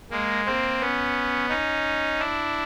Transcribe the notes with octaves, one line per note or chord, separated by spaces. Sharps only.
G#3 A#3
A#3 C4
B3 C#4
C#4 D#4
D4 E4